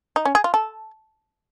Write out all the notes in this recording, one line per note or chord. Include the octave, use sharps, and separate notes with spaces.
D#4
C#4
G#4
F4
A4